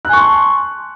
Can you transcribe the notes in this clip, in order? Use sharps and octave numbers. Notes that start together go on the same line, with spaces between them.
G#5 A5 C6 C#6 F#6